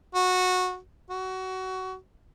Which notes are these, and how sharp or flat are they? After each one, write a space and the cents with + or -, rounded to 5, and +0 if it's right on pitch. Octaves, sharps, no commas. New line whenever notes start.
F#4 -15
F#4 +20